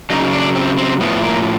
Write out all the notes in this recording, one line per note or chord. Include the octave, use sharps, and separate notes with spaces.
C#3 F#3 D#4
D4
C4
C4
A2 F3 B3
A#3